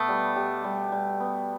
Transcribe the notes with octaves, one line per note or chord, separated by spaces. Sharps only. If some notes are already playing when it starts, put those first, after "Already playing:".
Already playing: B2 A3 B3
G3
G3
G3
G3
B3